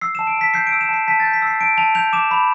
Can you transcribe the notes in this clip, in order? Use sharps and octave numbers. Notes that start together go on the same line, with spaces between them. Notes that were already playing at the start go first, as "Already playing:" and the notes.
E6 C7
E7
A5
D7
A5 B6
G6 C7
D7
E6
E7
A5 C7
A5 B6
A6
G6
B6
E6 C7
A5 D7
A5 F7
G6 F7
D6 E7
B5